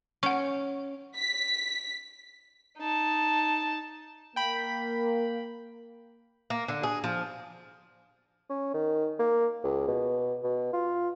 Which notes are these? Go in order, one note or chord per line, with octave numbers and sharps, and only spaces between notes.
C#4 F#5 C#6
B6
D#4 A5
A#3 G5 B5
A#3
D3
G#4
F3
C#4
D#3
A#3
C#2
B2
B2
F4